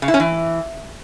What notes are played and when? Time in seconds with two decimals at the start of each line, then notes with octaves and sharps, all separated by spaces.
0.02 C#3
0.08 E4
0.14 C#4
0.20 E3